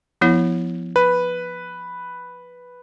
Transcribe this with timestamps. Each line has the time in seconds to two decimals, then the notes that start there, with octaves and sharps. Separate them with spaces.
0.21 F3 B3 E4
0.96 B4